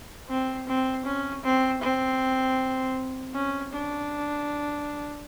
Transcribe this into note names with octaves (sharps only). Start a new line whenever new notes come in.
C4
C4
C#4
C4
C4
C#4
D4